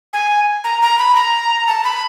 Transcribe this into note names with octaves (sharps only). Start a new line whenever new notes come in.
G#5
A#5
A#5
B5
A#5
A5
B5